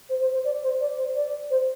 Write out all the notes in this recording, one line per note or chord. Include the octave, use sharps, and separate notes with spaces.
C5
C5
C5
D5
C5
D5
C5
D5
C5